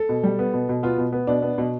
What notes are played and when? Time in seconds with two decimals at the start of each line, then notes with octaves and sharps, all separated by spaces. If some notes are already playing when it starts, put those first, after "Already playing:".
Already playing: A4
0.09 B2
0.24 G3
0.39 B3
0.54 B2
0.69 B2
0.83 B3 F4
0.98 B2
1.12 B3
1.27 B2 D4
1.42 B3
1.58 B2